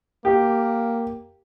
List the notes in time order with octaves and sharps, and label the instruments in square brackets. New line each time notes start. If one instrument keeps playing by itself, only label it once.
[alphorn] A#3 [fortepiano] G4